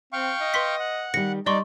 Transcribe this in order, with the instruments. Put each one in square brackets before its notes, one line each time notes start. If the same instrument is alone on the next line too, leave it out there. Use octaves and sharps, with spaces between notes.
[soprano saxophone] C4 [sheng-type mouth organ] F5 G5 C#6
[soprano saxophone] D#5
[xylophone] B4 C6 B6
[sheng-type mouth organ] F#5
[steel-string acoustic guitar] D#3 G3 [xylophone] A#6 C#7
[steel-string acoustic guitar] G3 [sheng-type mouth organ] D#4 [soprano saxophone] D5 [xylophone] D#5 C6 C#6